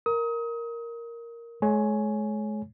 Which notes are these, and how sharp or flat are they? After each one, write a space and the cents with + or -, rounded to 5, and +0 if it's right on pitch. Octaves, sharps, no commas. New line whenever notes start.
A#4 +0 D#6 +30
G#3 +40 C#5 +0 G#5 +10